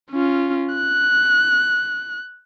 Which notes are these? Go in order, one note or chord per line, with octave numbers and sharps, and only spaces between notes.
C#4 F4
F#6